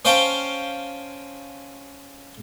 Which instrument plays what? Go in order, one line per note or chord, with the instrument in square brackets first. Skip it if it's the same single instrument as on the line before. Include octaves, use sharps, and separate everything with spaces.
[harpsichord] C#4 C5 F5 G5 A5